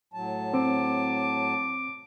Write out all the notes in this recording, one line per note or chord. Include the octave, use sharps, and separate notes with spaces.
A2 F#3 A5
C4 D6